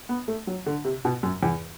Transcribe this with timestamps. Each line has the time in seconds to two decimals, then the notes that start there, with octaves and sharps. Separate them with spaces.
0.09 B3
0.28 A3
0.47 F#3
0.66 D3
0.85 C3
1.05 B2
1.23 F#2
1.43 E2